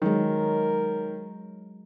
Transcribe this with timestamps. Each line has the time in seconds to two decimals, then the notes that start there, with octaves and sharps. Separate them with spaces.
0.02 D#3 F#3 G#3 A#4